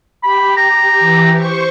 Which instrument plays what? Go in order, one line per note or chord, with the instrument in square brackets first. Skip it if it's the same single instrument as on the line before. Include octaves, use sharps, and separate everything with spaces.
[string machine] G4 [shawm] B5
[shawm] A#5
[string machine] E3 G4
C5 C#6